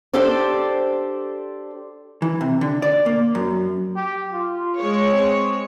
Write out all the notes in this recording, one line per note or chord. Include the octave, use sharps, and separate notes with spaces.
D4 G4 A4 C5 D5
E3
C3
D3
D5
A#3
F#2
G4
F4
G#3 C#5
C4